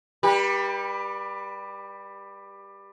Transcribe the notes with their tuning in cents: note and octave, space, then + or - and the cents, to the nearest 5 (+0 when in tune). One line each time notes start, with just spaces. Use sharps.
G3 +15 G4 +15 B4 -30